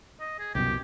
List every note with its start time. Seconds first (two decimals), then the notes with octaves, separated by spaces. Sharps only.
0.20 D#5
0.39 G#4
0.55 C2 F#2 B2 G4